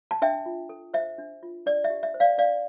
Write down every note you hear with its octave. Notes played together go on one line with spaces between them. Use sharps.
A5
D4 E5 G5
F4
A4
C5 E5
D4
F4
D4 D5
E5
G4
E5
C5
D5 F5
D4 D5 F5